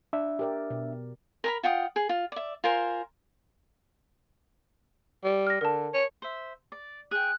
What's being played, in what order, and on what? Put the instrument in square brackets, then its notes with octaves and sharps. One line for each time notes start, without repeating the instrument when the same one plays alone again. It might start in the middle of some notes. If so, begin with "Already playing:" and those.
[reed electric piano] D4 E5
[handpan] G4 A#4 D5
B2
[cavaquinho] A#4 A#5 B5
F4 F#5 G5 D#6
G#4
F4
D5 E5
F4 A#4 C5 G#5
[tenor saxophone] G3
[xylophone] F6 A#6
[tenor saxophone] D3 [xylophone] A#4 A5
[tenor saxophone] C#5
[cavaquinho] C5 E5
D5
[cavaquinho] G#4 G5 [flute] F#6